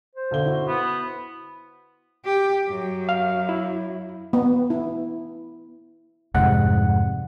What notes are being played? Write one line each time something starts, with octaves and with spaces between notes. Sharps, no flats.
C5
B1 D3 G7
E4 F#4
B3
G4
F#2
F5
E4
B3
E4
F2 G#2 C3 G3 F#5